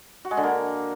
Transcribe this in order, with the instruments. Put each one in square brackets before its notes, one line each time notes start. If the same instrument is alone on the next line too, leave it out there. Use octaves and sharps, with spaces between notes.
[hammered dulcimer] F#4
G#3
D3
A#3